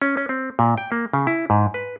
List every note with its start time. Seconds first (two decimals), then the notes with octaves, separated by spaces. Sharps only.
0.02 C#4
0.17 C#4
0.29 C4
0.59 A#2
0.78 G5
0.92 A#3
1.13 C#3
1.27 E4
1.50 G#2
1.74 B4